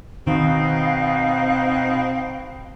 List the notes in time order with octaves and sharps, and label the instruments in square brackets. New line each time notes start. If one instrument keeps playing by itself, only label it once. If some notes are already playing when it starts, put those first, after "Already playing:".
[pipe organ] B2 D#4 [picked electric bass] D#3 [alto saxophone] C4 [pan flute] F5